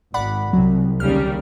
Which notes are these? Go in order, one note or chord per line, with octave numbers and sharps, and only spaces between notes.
G#1 D5 F#5 B5
C2 C3 F#3
D#2 C#3 G3 F6